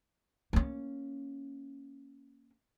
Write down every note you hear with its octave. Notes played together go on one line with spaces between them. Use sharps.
A#3 C#4